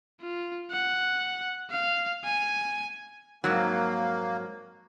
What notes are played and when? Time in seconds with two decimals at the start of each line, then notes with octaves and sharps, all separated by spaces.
0.21 F4
0.71 F#5
1.71 F5
2.25 G#5
3.44 F2 G#2 F#3 A#3